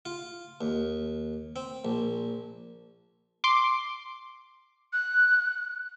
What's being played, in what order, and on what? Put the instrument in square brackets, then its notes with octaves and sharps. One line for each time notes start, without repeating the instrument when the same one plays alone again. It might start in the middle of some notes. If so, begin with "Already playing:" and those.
[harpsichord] F4
D#2
C4
A#1
[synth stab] C6 D6
[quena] F#6